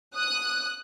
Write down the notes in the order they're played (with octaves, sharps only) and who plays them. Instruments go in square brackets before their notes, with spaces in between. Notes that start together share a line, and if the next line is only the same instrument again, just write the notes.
[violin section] D#6 [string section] F#6